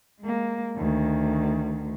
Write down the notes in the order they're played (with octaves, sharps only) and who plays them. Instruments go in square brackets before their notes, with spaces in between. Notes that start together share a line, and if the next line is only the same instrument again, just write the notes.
[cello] G#3 A#3
D2 D#3